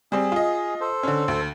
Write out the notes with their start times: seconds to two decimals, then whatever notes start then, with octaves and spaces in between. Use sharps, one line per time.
0.12 G3 C4 G#4
0.32 F4 D#5
0.81 A4 C5
1.03 D3 C#4
1.28 D2